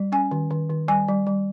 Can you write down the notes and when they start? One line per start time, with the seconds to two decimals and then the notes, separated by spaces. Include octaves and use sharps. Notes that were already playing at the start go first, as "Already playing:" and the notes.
Already playing: G3
0.12 C#4 G#5
0.31 D#3
0.51 D#3
0.70 D#3
0.88 G3 G#5
1.08 G3
1.27 G3